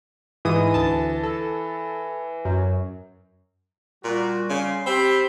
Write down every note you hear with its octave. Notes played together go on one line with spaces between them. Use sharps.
G#2 E3 D#6
D2 A5
A4
F#2
A#2 G3 F#4
C#3 C6
C4 G4 B5